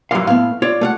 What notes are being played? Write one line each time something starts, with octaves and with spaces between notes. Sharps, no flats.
F#2 A#2 E3 F#3 F5
A2 B3 F5
F4 C#5 D5
A3 F5 F#5